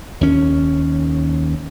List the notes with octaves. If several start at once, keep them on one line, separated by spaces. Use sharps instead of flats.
D#2 C#4